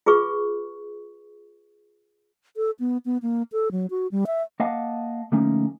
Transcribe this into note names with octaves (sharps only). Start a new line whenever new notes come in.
F4 G#4 B4 C#6
A4
B3
B3
A#3
A4
F#3
F#4
G3
E5
A#3 D#5 F5 F#5 A5
D3 F3 A3 A#3 C#4 D#4